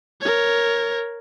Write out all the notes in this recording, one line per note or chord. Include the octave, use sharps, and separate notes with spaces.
A#4 C#5